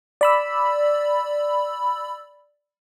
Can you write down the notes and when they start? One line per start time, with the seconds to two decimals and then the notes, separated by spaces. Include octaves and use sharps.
0.21 D5 B5 E6